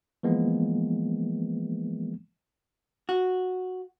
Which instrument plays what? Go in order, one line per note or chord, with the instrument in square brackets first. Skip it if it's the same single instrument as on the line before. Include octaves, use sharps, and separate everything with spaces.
[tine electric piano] E3 F3 G#3 A#3 B3
[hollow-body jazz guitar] F#4